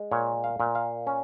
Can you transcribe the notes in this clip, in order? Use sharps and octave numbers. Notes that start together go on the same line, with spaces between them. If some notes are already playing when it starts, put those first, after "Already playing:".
Already playing: G#3
A#2 C#5
F5
A#2
F5
C#4